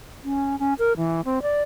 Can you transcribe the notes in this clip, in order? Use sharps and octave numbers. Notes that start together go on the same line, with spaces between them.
C#4
C#4
A#4
E3
C4
D5